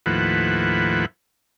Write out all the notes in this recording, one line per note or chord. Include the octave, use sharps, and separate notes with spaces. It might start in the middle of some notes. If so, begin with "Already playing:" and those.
D#2 A2 F3 E4 B4 F#5